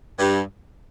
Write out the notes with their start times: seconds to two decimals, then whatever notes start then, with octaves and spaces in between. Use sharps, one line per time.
0.19 G2